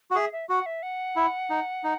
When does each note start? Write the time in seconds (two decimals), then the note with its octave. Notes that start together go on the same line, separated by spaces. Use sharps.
0.11 F#4
0.15 G#4 E5
0.32 E5
0.49 F#4 F#5
0.66 E5
0.83 F#5
1.16 E4
1.50 D#4
1.84 D#4